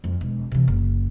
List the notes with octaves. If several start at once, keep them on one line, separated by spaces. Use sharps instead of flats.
F2
E1
C3 E3
F#1